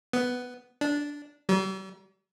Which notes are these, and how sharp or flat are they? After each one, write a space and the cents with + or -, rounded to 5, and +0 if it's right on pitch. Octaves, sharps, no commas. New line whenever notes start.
B3 +5
D4 -10
G3 -45